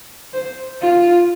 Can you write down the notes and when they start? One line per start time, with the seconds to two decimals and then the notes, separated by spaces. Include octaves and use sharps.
0.34 C5
0.82 F4